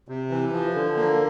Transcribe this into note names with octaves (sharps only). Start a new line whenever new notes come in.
C3
E3
F3
D3
A#3